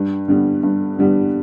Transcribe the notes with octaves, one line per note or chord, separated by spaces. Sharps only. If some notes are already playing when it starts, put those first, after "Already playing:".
Already playing: G2
D3 G3 B3
G2
D3 G3 B3